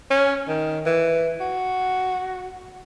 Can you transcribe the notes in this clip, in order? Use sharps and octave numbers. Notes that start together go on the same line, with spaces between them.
C#4
D#3
E3
F#4